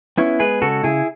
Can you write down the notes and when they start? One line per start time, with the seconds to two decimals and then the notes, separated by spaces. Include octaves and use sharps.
0.18 B3 C#4 E4
0.40 G#3 G#4 B4
0.62 C#3 F#4 A4
0.83 C#3 E4 G#4